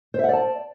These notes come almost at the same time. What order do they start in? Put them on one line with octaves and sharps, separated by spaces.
C5 E5 F#5 D5 A5